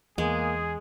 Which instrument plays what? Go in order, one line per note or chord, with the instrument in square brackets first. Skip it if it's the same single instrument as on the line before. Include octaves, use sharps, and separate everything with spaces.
[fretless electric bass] E2 [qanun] G#3 [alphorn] A#3 [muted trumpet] G#4